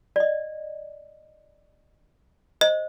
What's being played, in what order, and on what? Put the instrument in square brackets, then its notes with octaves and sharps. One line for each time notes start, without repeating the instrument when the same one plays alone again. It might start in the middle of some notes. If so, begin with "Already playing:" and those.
[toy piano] D5 D#5
[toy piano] C5 [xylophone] D#5